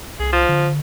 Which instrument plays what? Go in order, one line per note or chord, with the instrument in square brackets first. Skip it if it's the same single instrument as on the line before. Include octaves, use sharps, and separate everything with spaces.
[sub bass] C2 [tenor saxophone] G#4
[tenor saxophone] F3
[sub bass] D3